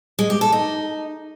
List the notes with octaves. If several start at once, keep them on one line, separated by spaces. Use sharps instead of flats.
G#3
G4
A4
D#4